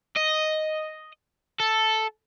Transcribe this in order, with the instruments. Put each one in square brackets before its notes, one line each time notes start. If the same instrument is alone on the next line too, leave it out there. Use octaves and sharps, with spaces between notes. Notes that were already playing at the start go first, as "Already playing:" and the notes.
[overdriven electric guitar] D#5
A4